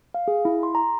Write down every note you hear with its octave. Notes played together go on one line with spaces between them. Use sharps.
F5
G#4
E4
C6
A#5